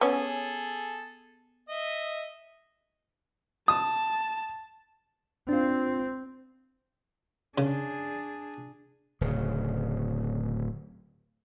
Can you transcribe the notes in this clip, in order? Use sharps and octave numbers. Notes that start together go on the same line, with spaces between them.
B3 C#4 G#4 A4
D#5 E5
A5 D#6
C4 D4 F4
C#3 D4 G#4
D1 C#3